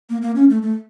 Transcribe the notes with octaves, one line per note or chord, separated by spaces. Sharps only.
A#3
A#3
C#4
A3
A3